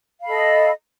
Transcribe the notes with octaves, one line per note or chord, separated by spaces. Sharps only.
A4 D#5 F5 B5